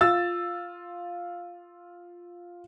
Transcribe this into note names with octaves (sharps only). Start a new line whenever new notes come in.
F4 E6 A6